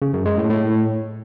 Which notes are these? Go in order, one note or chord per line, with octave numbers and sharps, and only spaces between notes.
C#3
F#2
G#3
A2
A2